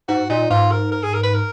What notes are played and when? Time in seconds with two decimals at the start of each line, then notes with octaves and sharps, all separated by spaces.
0.08 G#2 F#4
0.29 A#2 D#4
0.50 G#2 F4
0.72 A#4
0.92 A#4
1.03 G#4
1.14 A#4
1.23 B4
1.34 A#4